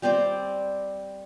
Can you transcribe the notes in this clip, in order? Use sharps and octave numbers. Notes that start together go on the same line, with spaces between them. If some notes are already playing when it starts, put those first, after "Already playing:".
G3 C4 C5 D5